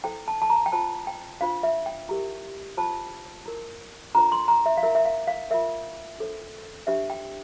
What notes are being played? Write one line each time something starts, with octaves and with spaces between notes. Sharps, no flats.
E4 A4 C5 G5
A5
A5
A#5
G5
F4 C5 A5
G5
D4 F4 C5 F5
E5
G5
E4 G4 A#4
F4 C5 A5
E4 A#4
D4 F4 A4 C5 A#5
C6
A#5
E5
F5
E4 A#4 E5
E5
F5
F5
F4 A#4 E5
D4 A4 C5
D4 G4 C5 E5
G5